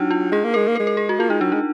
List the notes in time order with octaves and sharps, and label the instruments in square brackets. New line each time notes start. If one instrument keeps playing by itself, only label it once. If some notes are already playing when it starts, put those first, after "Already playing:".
Already playing: [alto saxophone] F#3 [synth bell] D4 D#4 F4
[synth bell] F4
[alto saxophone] G#3 [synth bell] G#4
[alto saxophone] A#3
[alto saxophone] G#3 [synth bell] A#4
[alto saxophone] A#3
[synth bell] A#4
[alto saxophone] G#3
[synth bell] A#4
G#4
F#4
[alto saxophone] A#3 [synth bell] F4
[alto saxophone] G#3 [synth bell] D#4
[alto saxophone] F#3 [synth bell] D4
[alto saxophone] G#3 [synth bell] D#4